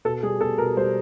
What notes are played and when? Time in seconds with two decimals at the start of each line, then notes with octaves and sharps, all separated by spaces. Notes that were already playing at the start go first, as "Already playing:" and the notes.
0.05 B2 A4
0.23 G3 G#4
0.40 B2 A4
0.58 B2 A#4
0.77 G3 C5